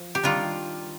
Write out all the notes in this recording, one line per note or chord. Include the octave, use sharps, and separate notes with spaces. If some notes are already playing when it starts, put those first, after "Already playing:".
Already playing: F3
G4
D#3 G3 D4 F4